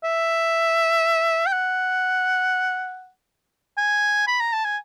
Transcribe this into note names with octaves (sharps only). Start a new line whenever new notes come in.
E5
G5
F#5
G#5
B5
A#5
A5
G#5